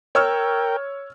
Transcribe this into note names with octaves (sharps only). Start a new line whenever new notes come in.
A#4 C#5 G5 E6 F6